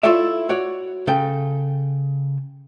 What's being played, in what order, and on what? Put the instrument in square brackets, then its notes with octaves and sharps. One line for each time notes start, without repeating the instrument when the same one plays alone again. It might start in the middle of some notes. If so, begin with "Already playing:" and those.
[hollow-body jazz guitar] E4 F4 A4 C#5 D5 E5
F#4 C#5 D5
C#3 A4 G5